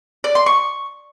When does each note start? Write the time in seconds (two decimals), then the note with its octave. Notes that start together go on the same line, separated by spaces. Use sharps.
0.24 D5
0.35 C6
0.46 C#6